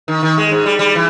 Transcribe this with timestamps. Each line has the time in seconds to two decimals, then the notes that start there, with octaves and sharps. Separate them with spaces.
0.08 D#3
0.23 D#3
0.38 G#3
0.51 G#2
0.66 G3
0.79 G3
0.95 E3